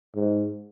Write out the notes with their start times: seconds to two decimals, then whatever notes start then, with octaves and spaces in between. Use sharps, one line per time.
0.15 G#2